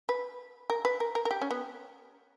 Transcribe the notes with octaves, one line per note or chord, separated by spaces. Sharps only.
B4
A#4
B4
A#4
A#4
A#4
G4
C#4
B3